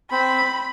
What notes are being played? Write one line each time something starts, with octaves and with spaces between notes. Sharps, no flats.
C4 B5